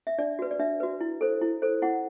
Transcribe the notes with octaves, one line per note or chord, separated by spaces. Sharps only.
E5
D4 D5
F#4 B4
D5
D4 E5
F#4 B4
E4
A4 C5
E4
A4 C5
E4 F#5